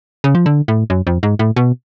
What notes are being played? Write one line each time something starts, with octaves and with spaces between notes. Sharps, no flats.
C#3
F3
D3
A2
F#2
F2
G#2
A2
B2